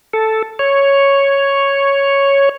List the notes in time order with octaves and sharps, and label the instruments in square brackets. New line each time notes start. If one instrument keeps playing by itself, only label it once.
[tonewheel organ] A4
C#5